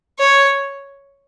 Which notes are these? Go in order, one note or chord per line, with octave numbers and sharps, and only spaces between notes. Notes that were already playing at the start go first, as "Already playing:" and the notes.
C#5